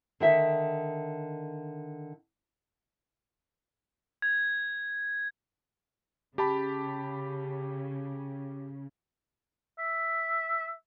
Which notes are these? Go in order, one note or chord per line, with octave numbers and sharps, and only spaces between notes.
D3 D#3 E5
G#6
C#3 G4 A5 B5
E5